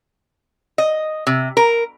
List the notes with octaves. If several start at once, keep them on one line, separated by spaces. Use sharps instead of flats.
D#5
C3
A#4